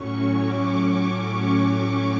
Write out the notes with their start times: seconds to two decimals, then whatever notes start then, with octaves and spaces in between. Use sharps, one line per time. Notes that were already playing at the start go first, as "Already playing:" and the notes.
Already playing: A2 F#3 C#4 C#6
0.38 D6
1.40 C#6